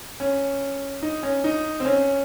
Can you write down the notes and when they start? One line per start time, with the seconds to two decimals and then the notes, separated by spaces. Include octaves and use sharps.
0.20 C#4
1.02 D#4
1.23 C#4
1.44 D#4
1.80 C4
1.85 C#4